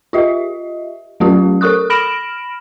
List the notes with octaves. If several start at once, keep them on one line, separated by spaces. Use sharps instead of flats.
F4 G4 D#5 E5
F#3 A3 C#4 F4 G4
A4 A#4 C#6 D#6 F#6
B5 F6 A#6 D7 E7 F#7